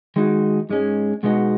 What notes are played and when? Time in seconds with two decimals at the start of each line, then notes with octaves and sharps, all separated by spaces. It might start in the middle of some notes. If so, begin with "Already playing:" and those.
0.16 D#3 G#3 D#4 F#4
0.70 G#2 G#3 C#4
1.23 B2 G#3 B3 D#4 F#4